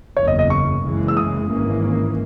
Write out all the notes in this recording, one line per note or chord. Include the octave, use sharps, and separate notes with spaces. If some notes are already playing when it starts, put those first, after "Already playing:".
F#1 E2 C#3 C#5
D#5
D#5
C#6
F#1 F#2 C#3 E3 G#3
E6
D#6
G#1 G#2 E3 A#3 C#4